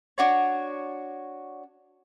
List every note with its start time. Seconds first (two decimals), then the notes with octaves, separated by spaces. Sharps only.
0.18 D4 F#4 C#5